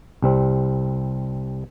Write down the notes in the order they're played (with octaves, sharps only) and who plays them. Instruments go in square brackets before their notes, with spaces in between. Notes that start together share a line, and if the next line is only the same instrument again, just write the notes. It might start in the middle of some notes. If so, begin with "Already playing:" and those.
[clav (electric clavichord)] C2 G3 C4